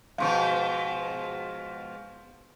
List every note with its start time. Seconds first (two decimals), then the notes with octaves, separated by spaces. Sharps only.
0.18 G#2 B2 F3 F5 C6 C#6